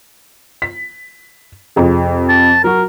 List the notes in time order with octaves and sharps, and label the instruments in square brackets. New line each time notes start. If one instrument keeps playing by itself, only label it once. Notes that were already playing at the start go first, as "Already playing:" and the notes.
[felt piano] B6
F2 C3 G#4
[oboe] A5
[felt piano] F#3 F#4 [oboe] A#4